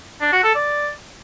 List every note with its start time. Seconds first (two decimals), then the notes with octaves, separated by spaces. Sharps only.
0.21 D4
0.32 F#4
0.44 A4
0.55 D5